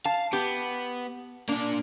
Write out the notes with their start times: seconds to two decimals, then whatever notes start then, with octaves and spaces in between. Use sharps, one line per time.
0.05 F5 A5
0.33 B3 G4
1.49 A#3 D4 D5